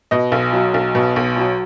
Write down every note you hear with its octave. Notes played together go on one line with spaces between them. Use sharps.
B2 D#5
B1
F#3
B1
B2
B1
F#3